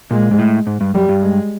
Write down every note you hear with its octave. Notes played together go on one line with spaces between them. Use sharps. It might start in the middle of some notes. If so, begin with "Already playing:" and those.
A#2 G#3
G#2
A2
G#2
G2
F#2 G3
G2
G#3